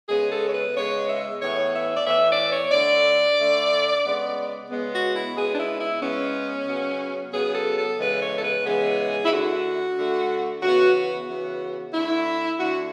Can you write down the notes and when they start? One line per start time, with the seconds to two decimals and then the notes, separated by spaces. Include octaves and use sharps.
0.09 C#3 G#3 B3 G#4
0.30 A4
0.47 C#5
0.53 B4
0.75 C#3 G#3 B3 C#5
1.07 E5
1.41 A2 E3 B3 C#5
1.74 E5
1.95 D5
2.07 A2 E3 B3 E5
2.29 D5
2.50 C#5
2.72 D3 A3 D5
3.39 D3 A3
4.04 C#3 G#3 B3
4.69 C#3 G#3 B3
4.93 F#4
5.14 E4
5.36 C#3 G#3 B3 G#4
5.53 D4
5.57 E4
5.79 E4
6.01 C#3 G#3 B3 C#4
6.68 C#3 F#3 B3
7.33 C#3 F#3 B3 G#4
7.55 A4
7.78 A4
7.99 C#3 E3 G#3 B3 B4
8.21 C#5
8.37 A4
8.43 B4
8.65 C#3 E3 G#3 B3 G#4
9.25 E4
9.30 D3 A3 F#4
9.97 D3 A3
10.62 C#3 E3 B3 F#4
10.95 F#4
11.29 C#3 E3 B3
11.94 D3 A3 E4
12.60 D3 A3 F#4